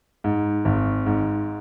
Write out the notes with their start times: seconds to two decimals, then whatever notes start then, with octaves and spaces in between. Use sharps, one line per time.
0.24 G#2
0.65 G#1
1.06 G#2